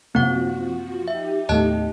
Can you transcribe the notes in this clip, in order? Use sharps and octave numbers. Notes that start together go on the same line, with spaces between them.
F#2 C3 F3 A#3 C4 F#4 F#5
D#4 G4 E5
D#2 A2 A3 D#5 A5 F#6